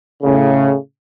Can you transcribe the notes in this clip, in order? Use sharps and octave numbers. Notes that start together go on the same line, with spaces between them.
A2 C#3